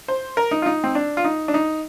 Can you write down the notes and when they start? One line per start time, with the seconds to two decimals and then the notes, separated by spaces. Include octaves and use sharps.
0.08 C5
0.37 A#4
0.51 D#4
0.62 F4
0.66 D#4
0.84 C4
0.95 D4
1.17 F4
1.25 D#4
1.48 D4
1.54 D#4